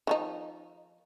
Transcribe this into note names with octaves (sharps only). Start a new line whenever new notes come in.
D#3 F3 D#4